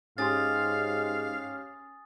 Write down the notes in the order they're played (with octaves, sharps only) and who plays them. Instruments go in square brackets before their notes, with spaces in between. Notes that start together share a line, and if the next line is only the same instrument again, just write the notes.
[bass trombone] G#2 [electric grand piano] C#4 G4 C6 [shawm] F5 [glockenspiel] G#5 D#6 A6